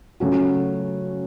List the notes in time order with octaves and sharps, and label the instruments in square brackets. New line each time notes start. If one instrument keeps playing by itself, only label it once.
[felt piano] C#3 F#3 A3 C#4 F#4